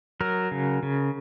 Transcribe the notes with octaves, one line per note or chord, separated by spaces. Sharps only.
F#3 A#4
C#3
C#3